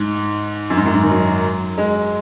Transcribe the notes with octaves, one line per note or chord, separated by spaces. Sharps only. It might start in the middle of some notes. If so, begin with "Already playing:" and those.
Already playing: G#2
F#2
G#2
F#2
G#2
D#3
F#3
G#3